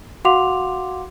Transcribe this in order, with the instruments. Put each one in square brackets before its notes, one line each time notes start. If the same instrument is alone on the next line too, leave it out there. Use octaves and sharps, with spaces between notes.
[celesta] F#4 F5 F#5 C6 D6 F7